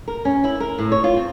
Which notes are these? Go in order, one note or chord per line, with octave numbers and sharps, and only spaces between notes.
A#4
C#4
E4
A#4
A2
C#5
F4
C4